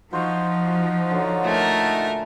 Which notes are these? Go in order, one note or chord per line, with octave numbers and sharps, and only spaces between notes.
F3 D#4 F4 F#4 C5 C#6
D3 F#3
A#2 A3 G#4 A#4